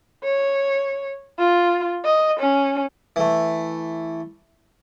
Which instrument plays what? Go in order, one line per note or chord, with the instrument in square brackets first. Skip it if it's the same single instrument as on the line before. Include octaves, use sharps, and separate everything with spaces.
[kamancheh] C#5
F4
D#5
C#4
[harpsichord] E3 A3